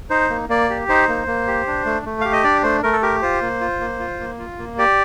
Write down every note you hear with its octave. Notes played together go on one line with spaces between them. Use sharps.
D#4 C5
A#3
A#3 D5
G4
D#4 C5
A#3
A#3
G4
D4
A3
A3
G4 F5
D#5
D4 D5
A3 C5
A3 A#4
A4
G4 A#4
F4 C5
A#3
F4
A#3
F4
A#3
F4
A#3
G4 D5